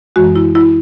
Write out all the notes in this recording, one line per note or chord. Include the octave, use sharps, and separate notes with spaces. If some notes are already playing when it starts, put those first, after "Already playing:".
F#2 E3 G#3 F#4
E4
E4